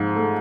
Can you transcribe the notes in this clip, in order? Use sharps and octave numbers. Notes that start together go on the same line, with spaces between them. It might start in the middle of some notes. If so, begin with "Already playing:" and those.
Already playing: G#2 F3
A3